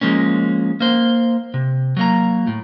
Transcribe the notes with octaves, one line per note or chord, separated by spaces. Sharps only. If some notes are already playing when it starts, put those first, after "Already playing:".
F3 G#3 A#3 C#4
A#3 C5
C3
F#3 A#3 A#5
A2